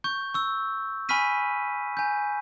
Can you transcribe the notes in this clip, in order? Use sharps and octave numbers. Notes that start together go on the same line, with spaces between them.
C#6 G6
C#6 E6
G#5 B5 C#6 F6 B6 D#7
G#5 G6